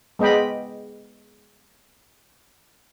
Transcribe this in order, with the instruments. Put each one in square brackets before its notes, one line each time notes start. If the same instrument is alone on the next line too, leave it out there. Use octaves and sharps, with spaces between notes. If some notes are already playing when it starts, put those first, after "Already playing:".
[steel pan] G#3 B3 D#5 G5 B5